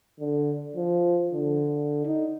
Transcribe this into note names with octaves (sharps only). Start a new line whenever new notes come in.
D3
F3
D3
D#4